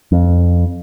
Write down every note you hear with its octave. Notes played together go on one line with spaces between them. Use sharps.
F2